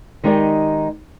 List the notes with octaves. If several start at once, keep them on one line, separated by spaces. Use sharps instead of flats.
D#3 G#3 D#4 G4 D5 D#5